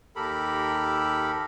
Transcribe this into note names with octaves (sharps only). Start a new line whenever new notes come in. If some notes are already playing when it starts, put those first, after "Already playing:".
D#2 G4 A4 A#4 B5